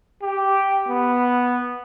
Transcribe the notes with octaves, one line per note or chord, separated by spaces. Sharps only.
G4
B3